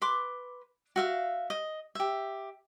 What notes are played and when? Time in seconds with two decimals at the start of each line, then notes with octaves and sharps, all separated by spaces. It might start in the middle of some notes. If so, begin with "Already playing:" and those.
0.02 B4 C6 D6
0.96 F#4 E5 F5
1.50 D#5
1.95 G4 E5